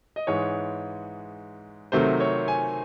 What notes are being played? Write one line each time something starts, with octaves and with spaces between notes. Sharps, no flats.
D#5
G#2 E3 G#3 C#5
C3 D#3 F#3 A3 C5
C#5
G#5